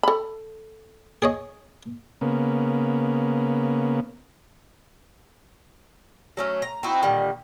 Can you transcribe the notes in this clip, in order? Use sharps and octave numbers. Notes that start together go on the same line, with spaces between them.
A4 B5
G#4 C#5 D#5
C#3 A#3 B3
F#3 A3 C#4
A#5
C4 D#4 E4 F#4
A#2 D3 D#3 G3